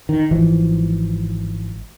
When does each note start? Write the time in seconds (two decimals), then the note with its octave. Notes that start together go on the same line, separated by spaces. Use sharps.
0.09 D#3
0.31 G#1 E3 F3